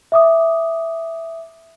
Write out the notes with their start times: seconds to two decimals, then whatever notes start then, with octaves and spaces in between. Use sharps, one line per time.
0.12 E5 D6 D#6